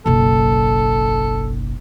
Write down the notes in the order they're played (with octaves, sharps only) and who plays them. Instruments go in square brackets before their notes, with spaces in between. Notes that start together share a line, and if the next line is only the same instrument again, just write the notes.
[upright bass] F#1 B1 [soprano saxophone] A4